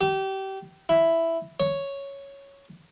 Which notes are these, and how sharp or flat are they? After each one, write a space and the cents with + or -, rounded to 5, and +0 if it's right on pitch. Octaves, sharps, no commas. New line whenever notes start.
G4 -25
E4 +5
C#5 +0